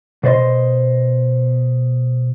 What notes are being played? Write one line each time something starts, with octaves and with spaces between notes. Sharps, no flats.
B2 C5 D5 D#5 C6